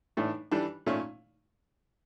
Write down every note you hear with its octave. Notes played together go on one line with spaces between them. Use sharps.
A2 E3 A3 D4 A4
E3 G3 D4 A4
A#2 A3 C#4